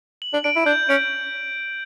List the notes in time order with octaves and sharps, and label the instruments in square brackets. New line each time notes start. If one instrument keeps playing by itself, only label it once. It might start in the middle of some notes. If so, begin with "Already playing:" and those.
[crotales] F#7
[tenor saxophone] D4
[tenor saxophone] D4 [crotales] D7
[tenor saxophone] E4
[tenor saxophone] D4 [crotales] G6
[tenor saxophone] C#4 [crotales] D7